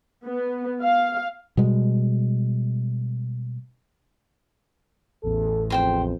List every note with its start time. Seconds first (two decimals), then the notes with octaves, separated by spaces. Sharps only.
0.24 B3
0.82 F5
1.57 B2 G3 G#3
5.23 A1 E2 A4
5.70 F2 C5 G5 C6